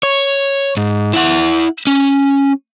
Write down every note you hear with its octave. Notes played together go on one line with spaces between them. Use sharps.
C#5
G#2
E4 F#5
C#4